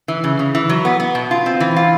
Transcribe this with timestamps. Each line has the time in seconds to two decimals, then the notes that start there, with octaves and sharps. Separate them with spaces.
0.08 E3
0.24 C#3
0.39 C#3
0.55 E3
0.69 F#3
0.85 B3
1.00 B3
1.15 B2
1.31 F4
1.46 C4
1.60 E3
1.76 F4